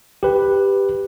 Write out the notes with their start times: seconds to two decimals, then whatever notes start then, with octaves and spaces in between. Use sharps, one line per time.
0.23 G4 B4